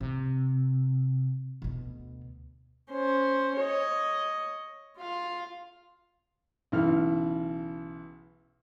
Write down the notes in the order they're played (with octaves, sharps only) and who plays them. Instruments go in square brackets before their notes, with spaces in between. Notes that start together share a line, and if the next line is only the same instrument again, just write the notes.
[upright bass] C3
D2 B2
[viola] C#4 C5
C#5 D#5
F4 F5
[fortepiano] B1 C#3 E3 F6